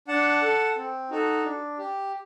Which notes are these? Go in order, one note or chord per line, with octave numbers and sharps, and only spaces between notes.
D4 F#5 A5
A4
C4
D#4 F#4 A4
D4
G4